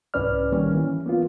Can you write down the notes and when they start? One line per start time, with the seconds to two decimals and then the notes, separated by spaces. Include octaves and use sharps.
0.14 C2 G#2 C#4 B4 D5 F6
0.52 D#3 G3 A#3 C#4
0.74 E3
1.06 A#3 B3 F4